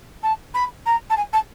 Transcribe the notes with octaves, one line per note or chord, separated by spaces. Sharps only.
A5
B5
A#5
A5
G#5
A5